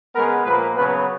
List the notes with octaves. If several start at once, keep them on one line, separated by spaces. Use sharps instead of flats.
C#3 G#3 B3 A#4
A#2 F3 A#3 B4
C#3 F#3 B3 B4